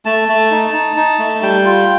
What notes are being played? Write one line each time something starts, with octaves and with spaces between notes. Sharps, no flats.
A3 A5
A3
D#4
D#4
D#4
A3
G3 G5
F4